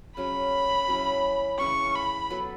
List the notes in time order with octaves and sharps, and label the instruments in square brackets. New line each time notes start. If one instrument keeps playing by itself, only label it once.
[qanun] C#3 F#3 C#4 [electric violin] B5
[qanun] F#3 C#4 E4
[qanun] C#3 E3 C#4 [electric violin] C#6
[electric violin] B5
[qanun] F#3 B3 A4